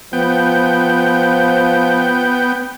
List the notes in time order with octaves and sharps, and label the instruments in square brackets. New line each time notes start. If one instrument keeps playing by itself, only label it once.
[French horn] F3 [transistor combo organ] B3 G5